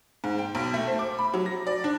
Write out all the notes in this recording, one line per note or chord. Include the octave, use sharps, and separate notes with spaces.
G#2
G5
B1
A3
C5
D6
B5
F#3
A#6
D5
D4